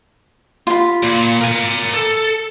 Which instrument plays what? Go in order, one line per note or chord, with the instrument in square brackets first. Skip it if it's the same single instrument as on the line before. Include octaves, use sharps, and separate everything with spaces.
[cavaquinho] F4 B5
[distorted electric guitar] A#2
A#4 G#5
A4